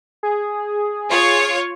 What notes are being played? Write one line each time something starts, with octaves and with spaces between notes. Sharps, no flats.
G#4
F4 C#5